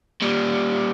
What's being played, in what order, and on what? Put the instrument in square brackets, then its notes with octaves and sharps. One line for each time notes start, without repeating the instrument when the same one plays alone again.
[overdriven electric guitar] A#2 G3